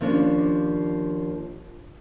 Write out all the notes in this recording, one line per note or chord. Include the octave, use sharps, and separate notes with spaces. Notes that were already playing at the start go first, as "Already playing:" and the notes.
D#2 F3 C#4 D4